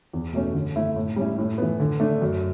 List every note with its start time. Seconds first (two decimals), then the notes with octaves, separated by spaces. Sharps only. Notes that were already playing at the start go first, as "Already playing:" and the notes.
0.13 E2
0.33 B2 A3 C#4
0.54 D3
0.76 A3 E4
0.96 A2
1.16 G3 C#4 E4
1.38 A2
1.58 E3 B3
1.80 D3
2.00 A3 D4
2.22 F#2